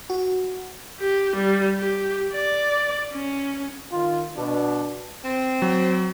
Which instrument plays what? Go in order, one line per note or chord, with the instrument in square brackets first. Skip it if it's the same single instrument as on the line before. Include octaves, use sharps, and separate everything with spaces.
[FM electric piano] F#4
[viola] G4
G3
G4
D5
C#4
[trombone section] D#3 F4
B2 D4
[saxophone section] C4
[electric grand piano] F#3